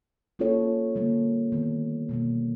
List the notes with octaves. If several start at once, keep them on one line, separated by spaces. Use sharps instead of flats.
A#3 C#4 F4 A4 C#5
D3 G3 A#3
D#3 G3 B3
B2 G3 A#3